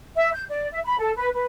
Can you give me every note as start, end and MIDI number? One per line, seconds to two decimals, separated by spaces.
0.15 0.31 76
0.33 0.43 91
0.48 0.67 74
0.72 0.79 76
0.84 0.95 83
0.98 1.11 69
1.16 1.27 71
1.35 1.45 71